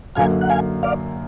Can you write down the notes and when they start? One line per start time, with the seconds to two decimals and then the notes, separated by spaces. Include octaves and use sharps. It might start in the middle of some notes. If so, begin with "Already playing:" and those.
0.15 F#2 D3 F#3 A#3 F5 G#5
0.41 F#5
0.50 F5 G#5
0.83 D5 F5